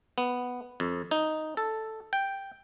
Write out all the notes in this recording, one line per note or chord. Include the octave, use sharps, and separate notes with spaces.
B3
F2
D#4
A4
G5